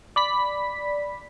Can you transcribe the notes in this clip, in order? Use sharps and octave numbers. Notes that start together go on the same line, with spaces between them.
D5 B5 B6